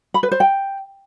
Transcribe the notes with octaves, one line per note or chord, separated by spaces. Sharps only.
B5
B4
C5
G5